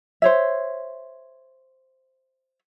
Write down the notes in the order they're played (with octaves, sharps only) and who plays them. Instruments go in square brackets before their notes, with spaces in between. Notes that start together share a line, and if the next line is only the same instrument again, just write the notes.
[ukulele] C5 C#5 E5